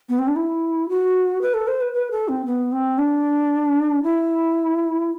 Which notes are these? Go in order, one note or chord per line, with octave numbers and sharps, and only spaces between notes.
B3
C4
D4
E4
F#4
B4
A4
C5
B4
B4
A4
C4
B3
C4
D4
E4